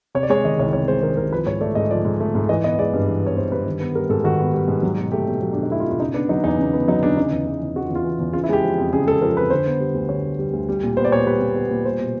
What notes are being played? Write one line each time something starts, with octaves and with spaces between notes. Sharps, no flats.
C3 C#5
D5
G#3 C#5
D#3 D#5
C2 C#5
C3 C#5
G#3 C5
D#3 A#4
C2 A#4
F3 B4
G#2 C#5
A3 D5
G#2 D#5
F3 D5
G#2
A3
G#2
E3 D#5
B3 D#5
G#3 D5
G2
E3
B3 C#5
G#3 C5
G2 B4
D#3
B3
G3 A#4
G#2 A4
D#3 F#4
B3
G3
G#2
F#3
B2
A3 G4
B2
F#3
B2 D4
D#4
A3 E4
F4
B2
F4
C#3 D#4
B3 D4
F#3 D#4
E2 D#4
C#3
B3
F#3 D#4
E2 D4
C#3 D#4
E2
E3
E2
C#3 F#4
F4
E2
F4
E3
E2
C#3 F4
E4
G#3 G4
F3
F2
C#3 G#4
G#3 A4
F3 A#4
F2 B4
D3 C5
B3
G3
D2
D3 C#5
B3
G3
D2
G3
A#2
B3 C5
D5
A#2 C#5
G3 B4
A#2
B3
A#2
G3 C5
B2